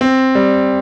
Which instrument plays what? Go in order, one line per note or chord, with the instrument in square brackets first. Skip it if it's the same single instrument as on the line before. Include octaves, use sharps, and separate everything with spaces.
[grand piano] C4
G3